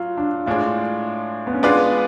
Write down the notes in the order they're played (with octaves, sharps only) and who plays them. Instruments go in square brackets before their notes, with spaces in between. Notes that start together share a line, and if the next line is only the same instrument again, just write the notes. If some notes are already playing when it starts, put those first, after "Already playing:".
Already playing: [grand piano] F#3 [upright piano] F4
[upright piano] D4
[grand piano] A2 G#3 D4 [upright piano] F4
[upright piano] B3
C#4
[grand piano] G#3 B3 F4 B4 D5 [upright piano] D4